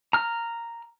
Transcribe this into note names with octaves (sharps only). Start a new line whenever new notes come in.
A#5 F6